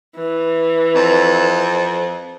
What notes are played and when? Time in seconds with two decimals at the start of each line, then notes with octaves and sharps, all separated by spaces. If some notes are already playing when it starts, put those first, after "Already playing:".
0.16 E3
0.95 F2